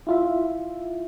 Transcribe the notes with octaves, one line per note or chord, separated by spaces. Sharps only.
E4 F4 E5